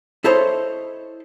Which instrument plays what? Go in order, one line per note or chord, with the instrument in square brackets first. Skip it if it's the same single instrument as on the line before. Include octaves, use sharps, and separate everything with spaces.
[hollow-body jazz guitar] E4 A4 C5 C#5 D#5